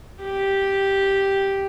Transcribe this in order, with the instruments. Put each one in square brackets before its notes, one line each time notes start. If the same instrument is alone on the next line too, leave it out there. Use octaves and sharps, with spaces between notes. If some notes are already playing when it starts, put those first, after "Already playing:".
[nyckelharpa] G4